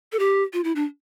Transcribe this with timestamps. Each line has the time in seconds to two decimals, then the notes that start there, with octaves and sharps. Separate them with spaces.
0.12 A4
0.19 G4
0.53 F4
0.64 E4
0.76 D4